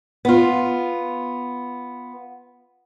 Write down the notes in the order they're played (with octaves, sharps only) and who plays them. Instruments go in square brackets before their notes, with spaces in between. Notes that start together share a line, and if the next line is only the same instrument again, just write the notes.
[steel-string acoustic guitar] B3 F4